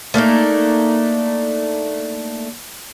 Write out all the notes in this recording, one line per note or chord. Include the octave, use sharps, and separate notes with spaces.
A3 A#3 D4 D#4